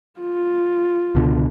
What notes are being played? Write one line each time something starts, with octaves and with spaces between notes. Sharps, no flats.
F4
C#2 B2 D3